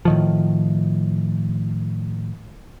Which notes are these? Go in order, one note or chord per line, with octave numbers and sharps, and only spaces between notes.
A2 D#3 F3